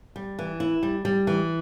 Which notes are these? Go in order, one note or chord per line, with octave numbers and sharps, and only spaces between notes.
G3
E3
E4
G3
G3
E3